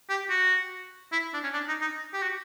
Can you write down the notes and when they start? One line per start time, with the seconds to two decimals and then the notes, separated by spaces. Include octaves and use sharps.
0.09 G4
0.30 F#4
1.12 E4
1.34 D4
1.44 C#4
1.54 D4
1.68 D#4
1.81 D#4
2.14 G4
2.22 F#4